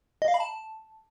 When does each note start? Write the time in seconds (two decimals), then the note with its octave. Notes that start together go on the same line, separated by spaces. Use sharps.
0.22 D#5
0.28 F5
0.34 B5
0.40 A5